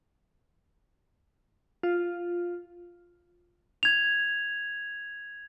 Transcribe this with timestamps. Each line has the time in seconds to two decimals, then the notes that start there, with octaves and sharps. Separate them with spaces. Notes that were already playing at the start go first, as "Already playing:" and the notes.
1.83 F4
3.83 G#6 F7